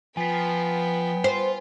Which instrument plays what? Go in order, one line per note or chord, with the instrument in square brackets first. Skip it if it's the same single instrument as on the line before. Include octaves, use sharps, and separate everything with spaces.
[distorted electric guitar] F3 [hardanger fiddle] B3 G5 [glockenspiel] G#5 B6
[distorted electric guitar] F4 [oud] C5